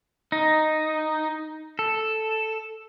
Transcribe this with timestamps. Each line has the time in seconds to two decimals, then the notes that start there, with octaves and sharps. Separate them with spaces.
0.32 D#4
1.79 A4